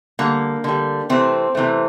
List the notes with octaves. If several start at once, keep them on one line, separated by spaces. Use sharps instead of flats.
D3 G3 A#3
D3 G3
C3 E3 A3 C4
C3 E3 A3